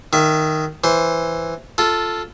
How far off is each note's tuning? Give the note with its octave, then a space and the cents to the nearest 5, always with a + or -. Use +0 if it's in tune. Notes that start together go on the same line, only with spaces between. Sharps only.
D#3 +0 E5 +20
E3 +0 C5 +0
F4 +0 A4 +0